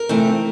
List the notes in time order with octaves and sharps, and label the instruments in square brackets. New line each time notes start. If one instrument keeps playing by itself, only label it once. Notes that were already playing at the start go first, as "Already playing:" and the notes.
Already playing: [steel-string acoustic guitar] A#4
C3 E3 A3 C4